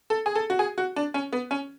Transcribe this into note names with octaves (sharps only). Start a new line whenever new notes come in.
A4
G#4
A4
F#4
G#4
F#4
D4
C#4
B3
C#4